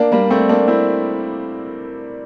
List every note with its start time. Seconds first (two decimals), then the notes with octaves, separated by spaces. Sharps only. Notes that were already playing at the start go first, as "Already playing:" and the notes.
Already playing: A#3 D4
0.12 G3 A#3
0.30 A3 C4
0.49 A#3 D4
0.68 C4 E4